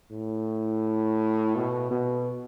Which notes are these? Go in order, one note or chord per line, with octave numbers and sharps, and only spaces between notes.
A2
B2
B2